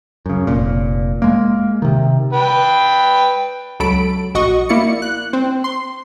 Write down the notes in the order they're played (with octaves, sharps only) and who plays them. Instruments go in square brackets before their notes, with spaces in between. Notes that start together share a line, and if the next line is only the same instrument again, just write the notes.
[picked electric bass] F#2 C#3
F1 A#2
G#3 A#3
C3 D#3
[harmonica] B4 G5
[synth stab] C#2 F#3 A4 B5 D7
A#1 F#4 D#5 C#6
A#3 E4 D5 C#7
F#6
C4
C6